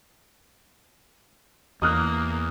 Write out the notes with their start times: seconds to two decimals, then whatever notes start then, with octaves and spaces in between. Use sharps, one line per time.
1.82 E2 A#3 D#6 F6 F#6